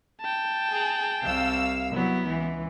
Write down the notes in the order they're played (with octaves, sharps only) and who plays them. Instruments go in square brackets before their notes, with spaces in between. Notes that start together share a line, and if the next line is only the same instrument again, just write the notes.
[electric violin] G5 A5
[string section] G#4
C2 F5 E6
[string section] F#3 E4 [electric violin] B3
[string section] C#2 E3